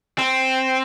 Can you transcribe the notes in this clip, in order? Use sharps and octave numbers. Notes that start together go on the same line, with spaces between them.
C4